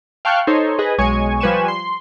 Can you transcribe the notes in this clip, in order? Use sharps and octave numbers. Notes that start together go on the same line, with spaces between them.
F5 G5 A5 C#6 F6 F#6
D#4 A4 C5 C#5 C6
G#4 B4 D#5
B1 G#3 C#5 G#5 C#6
F3 G3 B4 G#5 C#6 E7
C6